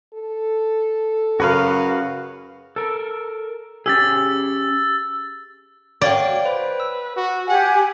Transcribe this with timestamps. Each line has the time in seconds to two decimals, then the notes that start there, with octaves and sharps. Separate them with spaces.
0.14 A4
1.40 F#2 C#3 F#4 B4 F5
2.76 A4 A#4
3.86 C#4 G4 G#4 E6 A6
6.01 F#4 C#5 D5 F5 G5
6.45 B4 C5
6.80 E6
7.16 F#4
7.48 G4 F#5 G#5